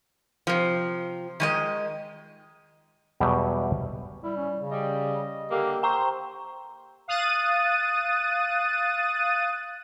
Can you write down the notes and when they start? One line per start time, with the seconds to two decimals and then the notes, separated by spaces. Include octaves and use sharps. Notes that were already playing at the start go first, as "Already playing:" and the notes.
0.47 C3 F3
1.40 D#3 G#3 D#5
3.20 E2 B2 F#3 G3 G4 D#5
4.23 G3 E4
4.37 C#4
4.56 C#3
4.71 G3 D#5
5.51 D3 A#3 G4
5.83 C5 G5 A#5 C#6
7.08 F5 D#6 F#6 A6 D#7